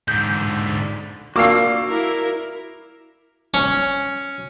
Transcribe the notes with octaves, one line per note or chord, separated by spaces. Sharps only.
G#2 D3 G6
A#3 D4 F4 F#4 F5 D6 E6 C7
E4 A#4
C#4